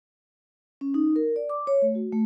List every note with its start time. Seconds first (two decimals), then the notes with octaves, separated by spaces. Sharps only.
0.81 C#4
0.94 D#4
1.16 A#4
1.36 D5
1.50 D6
1.67 C#5
1.82 A3
1.95 F#4
2.12 A3